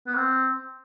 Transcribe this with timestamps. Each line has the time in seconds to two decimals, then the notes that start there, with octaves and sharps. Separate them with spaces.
0.07 B3
0.15 C4